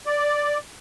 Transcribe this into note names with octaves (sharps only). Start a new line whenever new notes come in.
D5